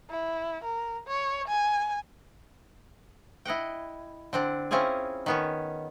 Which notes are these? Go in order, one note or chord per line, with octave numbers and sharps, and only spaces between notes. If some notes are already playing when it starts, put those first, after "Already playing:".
E4
A#4
C#5
G#5
E4 D#5 F#5 G5
D3 C4 D4
C4 C#4 E4 F4 G#4
D#3 B3 C#4